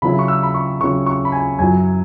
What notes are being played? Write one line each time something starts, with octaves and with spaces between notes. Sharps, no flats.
C#3 F#3 C#4 E4 B5
C#6
E6
B5
C#6
C#3 F#3 C#4 E4 C#6
C#6
B5
G#5
F#2 F#3 E4 G#5